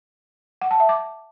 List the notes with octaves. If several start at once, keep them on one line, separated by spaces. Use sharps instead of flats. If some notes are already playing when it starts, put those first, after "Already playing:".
F#5
A5
E5
D6